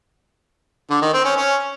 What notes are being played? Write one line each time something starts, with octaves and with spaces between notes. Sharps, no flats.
D3
D#3
C4
C#4
C#4